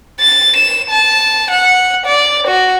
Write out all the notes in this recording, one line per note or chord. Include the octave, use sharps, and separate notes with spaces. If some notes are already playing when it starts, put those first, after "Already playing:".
A6
E7
A5
F#5
D5
F#4